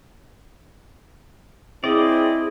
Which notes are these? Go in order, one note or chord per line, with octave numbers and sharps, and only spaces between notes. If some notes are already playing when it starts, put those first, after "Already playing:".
C4 E4 G#4 D5 D#5